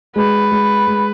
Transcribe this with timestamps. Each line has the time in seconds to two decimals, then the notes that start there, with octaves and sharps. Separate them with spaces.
0.16 G#3 B4
0.52 G#3
0.87 G#3